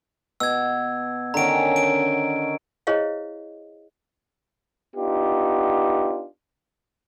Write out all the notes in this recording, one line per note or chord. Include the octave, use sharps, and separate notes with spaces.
B2 E6 G#6
D3 D#3 C#4 A#5 D7
D7
E4 G#4 C5 C#5 D#5 F5
B3 D4 D#4 F4 G4